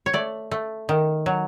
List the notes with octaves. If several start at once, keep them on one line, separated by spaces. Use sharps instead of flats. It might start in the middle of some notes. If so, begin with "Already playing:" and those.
C#5
A3 D5
A3
D#3
F#3